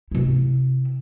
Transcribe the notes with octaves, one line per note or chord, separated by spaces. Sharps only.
C3 E4